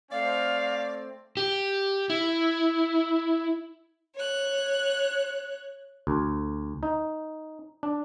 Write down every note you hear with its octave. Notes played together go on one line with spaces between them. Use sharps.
A3 C4 D5 F5
G4
E4
C#5 F#6
D2
D#4
D4